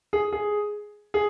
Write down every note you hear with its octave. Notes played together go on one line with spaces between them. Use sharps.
G#4
G#4
G#4